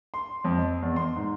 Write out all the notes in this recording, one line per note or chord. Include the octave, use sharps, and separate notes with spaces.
C6
F2
D#5
E2
C6
G#2